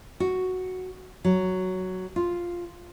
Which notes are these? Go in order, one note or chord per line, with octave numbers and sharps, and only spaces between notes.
F#4
F#3
F4